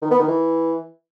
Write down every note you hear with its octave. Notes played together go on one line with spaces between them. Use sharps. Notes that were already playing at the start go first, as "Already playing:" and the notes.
D#3
B3
D#3
E3